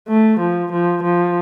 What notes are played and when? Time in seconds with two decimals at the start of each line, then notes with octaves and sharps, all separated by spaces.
0.08 A3
0.40 F3
0.72 F3
1.03 F3